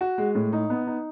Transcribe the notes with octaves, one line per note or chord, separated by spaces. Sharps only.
F#4
G#3
A2
D#4
B3
D#4